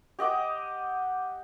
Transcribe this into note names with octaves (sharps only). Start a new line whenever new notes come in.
G4 D#5 F#5 D6